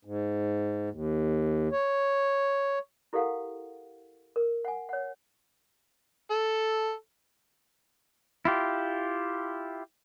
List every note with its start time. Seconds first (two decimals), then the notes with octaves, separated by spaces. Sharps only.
0.05 G#2
0.90 D#2
1.72 C#5
3.13 E4 G4 A4 A#4 F5 F#5
4.36 A#4
4.65 F#5 G#5
4.89 C#5 F#5
6.30 A4
8.45 E4 F4 G4